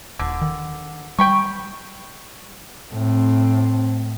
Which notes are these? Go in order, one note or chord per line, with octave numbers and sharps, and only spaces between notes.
D#1 D3
D#3
G3 G5 B5 C#6
A2 C4